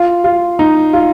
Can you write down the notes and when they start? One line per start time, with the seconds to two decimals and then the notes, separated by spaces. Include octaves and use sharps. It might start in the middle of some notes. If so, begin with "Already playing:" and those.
Already playing: F4
0.24 F4
0.59 D#4
0.93 F4